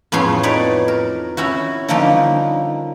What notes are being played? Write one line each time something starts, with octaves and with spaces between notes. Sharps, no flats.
F2 A2 B3 C#4 G#4 C6
D#4 B4 C#5 D5
A#4
C#4 E4 F#4
D3 F3 G3 A#3 C#4 D#4